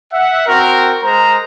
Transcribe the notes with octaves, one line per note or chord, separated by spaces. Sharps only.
E5 F#5
C4 F#4 A#4
G#3 A#4 C5 A#5